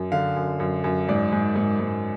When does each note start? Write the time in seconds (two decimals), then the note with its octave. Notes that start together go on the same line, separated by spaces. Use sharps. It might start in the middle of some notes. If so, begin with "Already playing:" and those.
Already playing: F#2
0.12 D3 F5
0.36 F#2
0.60 F#2
0.84 F#2
1.09 G#2 D5
1.32 G#2
1.55 G#2
1.80 G#2